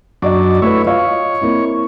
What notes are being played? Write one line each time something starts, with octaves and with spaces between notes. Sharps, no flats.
F#2 D4 F#4 D5 D#5
A3 E4 B4 C#5
F4 C#5 D#5 F5
A#3 C4 E4